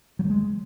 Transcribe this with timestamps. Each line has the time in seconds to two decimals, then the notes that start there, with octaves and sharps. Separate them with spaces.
0.19 F#3
0.24 E3
0.30 G#3